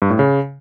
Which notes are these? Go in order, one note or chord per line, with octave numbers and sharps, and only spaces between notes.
G2
A2
C#3